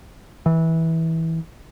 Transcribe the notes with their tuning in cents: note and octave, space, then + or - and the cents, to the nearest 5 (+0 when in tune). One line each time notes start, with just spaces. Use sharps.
E3 -20